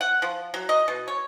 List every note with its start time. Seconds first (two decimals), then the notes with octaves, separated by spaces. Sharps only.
0.01 F#5
0.22 F3
0.54 F#3
0.69 D#5
0.88 B2
1.08 C#5